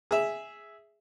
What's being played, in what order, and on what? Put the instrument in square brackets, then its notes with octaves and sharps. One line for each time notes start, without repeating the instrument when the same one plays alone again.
[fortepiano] G#4 E5